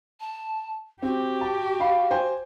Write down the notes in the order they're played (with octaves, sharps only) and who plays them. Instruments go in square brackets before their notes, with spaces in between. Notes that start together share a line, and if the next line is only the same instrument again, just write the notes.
[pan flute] A5
[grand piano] C4 [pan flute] F#4 [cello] G4
[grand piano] A5
F5 B5
C5 G5 G#5